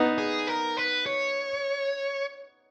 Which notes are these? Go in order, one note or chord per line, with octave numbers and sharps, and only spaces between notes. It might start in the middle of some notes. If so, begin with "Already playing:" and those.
Already playing: B3 D#4
G#4
A#4
B4
C#5